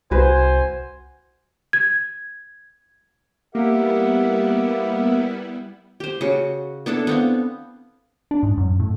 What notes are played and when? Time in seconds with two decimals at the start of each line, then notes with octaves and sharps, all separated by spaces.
0.11 C2 F#4 B4 C5 G#5
1.73 G#6
3.55 G3 A#3 B3 E4 G4 A#4 E5 F#5
6.00 G4 C5
6.21 C#3 F#4
6.86 B3 D4 E4 A4
7.07 B3 C4 F5
8.31 D4
8.43 G#2
8.58 F#2
8.79 A2